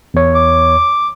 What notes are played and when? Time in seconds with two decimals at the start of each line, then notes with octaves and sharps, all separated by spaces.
0.14 E2 C#5
0.35 D6